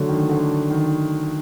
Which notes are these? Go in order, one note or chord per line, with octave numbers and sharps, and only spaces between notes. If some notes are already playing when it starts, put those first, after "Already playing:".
Already playing: D3 F#3 A3
D#3
D3
D#3